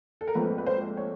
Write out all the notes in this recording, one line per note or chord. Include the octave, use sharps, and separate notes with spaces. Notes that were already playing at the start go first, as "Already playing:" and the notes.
A4
A#4
A#1 G#2 F3 A3 C4 B4
B4
C5
C#5